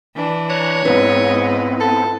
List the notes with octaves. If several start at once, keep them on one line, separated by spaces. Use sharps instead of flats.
E3 D4
C#5 A#5 F#6
G#2 B3 C4 D#4 E4 B4
A4